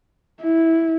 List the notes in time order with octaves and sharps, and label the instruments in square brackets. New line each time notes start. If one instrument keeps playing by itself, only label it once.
[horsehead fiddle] E4